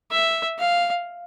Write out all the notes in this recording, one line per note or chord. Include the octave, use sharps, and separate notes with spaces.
E5
F5